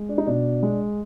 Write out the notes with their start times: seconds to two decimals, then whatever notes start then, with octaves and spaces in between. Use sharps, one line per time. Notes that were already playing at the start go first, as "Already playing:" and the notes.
Already playing: G#3
0.09 D4
0.18 D#4
0.27 B2 D4
0.63 G#3